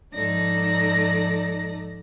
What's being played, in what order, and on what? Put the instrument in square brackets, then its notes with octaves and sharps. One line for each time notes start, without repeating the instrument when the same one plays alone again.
[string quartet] G#2 F3 D#4 A4 D5 A#6